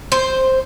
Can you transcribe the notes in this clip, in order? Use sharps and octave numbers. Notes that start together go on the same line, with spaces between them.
C5